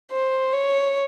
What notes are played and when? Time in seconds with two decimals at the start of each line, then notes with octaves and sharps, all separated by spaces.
0.11 C5
0.53 C#5